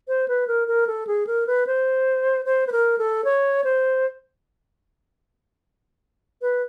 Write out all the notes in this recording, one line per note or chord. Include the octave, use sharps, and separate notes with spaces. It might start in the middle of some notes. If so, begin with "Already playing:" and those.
C5
B4
A#4
A#4
A4
G#4
A#4
B4
C5
C5
B4
A#4
A4
C#5
C5
B4